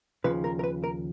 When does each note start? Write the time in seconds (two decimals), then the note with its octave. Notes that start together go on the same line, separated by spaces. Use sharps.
0.24 D#2 C#3 F3 B4
0.44 A#4
0.59 A#4
0.64 B4
0.84 A#4